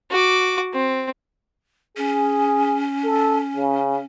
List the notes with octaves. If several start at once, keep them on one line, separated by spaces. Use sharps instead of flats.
F#4 D6
C4
C#4 G#4
A4
C#3